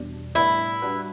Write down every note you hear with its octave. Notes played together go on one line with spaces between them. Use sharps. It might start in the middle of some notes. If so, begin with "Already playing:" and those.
Already playing: E2 B2 G3 D4
A2 G3 B3 D4 E4
G3 D4 F#4 B4